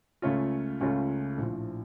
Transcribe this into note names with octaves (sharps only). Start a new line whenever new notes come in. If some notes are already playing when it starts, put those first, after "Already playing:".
C#2 C#3 A3 C#4 F4
C#2 C#3 A3 C#4 F4
A#1 A2 F3